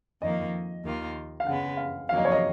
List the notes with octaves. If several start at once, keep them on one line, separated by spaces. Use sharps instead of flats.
F2 D#3 A#3 D#5
D#2 D#3 A#3 F4
F5
C#3 G#3 B3 F#5
F5
F2 D#3 F#3 A#3 F5
D#5
C#5
D#5